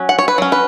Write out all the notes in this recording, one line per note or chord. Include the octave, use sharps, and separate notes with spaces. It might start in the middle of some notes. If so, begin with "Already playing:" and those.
Already playing: F#3 C#4
F#5
C#5
B4
F#3 C#4
B4